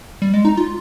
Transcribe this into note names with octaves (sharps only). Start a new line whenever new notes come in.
G3
G#3
D#4
F4